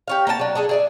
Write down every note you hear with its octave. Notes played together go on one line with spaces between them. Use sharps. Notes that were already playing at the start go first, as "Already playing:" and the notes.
G4 C#5 F5
A#3 B3 D4 A5
F#3 D4
D4 G#4 A4
G#4 D5 E5